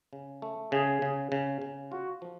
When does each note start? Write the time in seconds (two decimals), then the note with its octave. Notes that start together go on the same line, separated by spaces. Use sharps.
0.13 C#3
0.42 A3
0.72 C#3 G#4
1.02 C#3
1.32 C#3
1.62 C#3
1.92 F4 F#4
2.22 F3